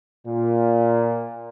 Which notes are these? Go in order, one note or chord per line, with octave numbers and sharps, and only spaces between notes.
A#2